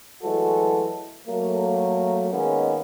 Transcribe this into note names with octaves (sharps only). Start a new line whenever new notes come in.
E3 F#3 G#3 A3 F#4 A4
F#3 A3 A#3
D#3 G#3 A#3 B3 C#4 D#4